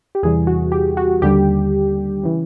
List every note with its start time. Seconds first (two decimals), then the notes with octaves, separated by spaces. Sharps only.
0.15 G4
0.23 E2 C3 E3 G3 G#4
0.47 F#4
0.72 G4
0.97 F#4
1.22 D#2 D3 G3 G4
2.23 C#3 E3